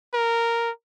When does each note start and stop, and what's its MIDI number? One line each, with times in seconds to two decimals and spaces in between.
0.13 0.70 70